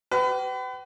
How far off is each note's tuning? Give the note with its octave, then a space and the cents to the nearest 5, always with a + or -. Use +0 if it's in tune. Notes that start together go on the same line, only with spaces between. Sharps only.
G4 -40 B4 +35